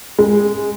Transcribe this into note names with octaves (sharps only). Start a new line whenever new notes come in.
G#3